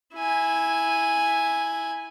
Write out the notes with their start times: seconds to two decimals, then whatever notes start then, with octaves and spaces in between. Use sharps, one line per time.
0.15 E4 G#5